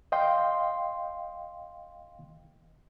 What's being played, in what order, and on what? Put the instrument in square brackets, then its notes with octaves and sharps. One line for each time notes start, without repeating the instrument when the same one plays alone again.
[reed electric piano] D#5 F5 G5 C6